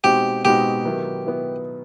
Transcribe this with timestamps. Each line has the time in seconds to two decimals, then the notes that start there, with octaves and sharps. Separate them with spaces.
0.04 B2 G#3 C4 D#4 F#4 G4
0.45 B2 G#3 C4 D#4 F#4 G4
0.85 D#3 F#3 B3 E4
1.26 B3 E4